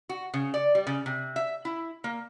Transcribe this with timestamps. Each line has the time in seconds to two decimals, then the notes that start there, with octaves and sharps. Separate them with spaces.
0.09 F#4
0.34 C#3
0.54 D5
0.75 G3
0.87 C#3
1.06 C3
1.36 E5
1.65 E4
2.04 A#3